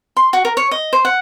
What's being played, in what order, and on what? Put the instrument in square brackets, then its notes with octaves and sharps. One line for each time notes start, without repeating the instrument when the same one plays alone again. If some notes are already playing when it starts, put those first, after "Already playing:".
[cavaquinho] C6
F#4
A#4
C#5
D#5
C5
F#5